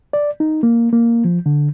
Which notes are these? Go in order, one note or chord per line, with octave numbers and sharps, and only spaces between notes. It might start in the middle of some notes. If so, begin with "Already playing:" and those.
D5
D#4
A#3
A#3
F3
D3